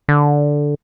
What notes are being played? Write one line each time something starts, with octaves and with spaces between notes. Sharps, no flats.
D3